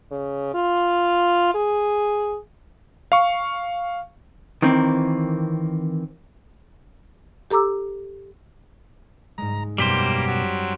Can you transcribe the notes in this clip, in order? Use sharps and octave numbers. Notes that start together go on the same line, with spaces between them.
C#3
F4
G#4
F5 C#6
D#3 E3 A#3 C4
G4 A4 A#5 D6 E6
G#2 G#3 A#5
F#2 B2 G3 A#3 G4 C5
F#3